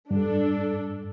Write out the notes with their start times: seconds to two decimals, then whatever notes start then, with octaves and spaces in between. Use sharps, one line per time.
0.11 G2 D4 A4